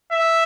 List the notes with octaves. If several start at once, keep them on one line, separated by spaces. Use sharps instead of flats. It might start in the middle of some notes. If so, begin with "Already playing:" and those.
E5